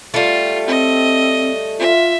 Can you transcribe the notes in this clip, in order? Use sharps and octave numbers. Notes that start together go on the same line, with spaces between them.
G3 A3 F4
C4 D#5
F4 E5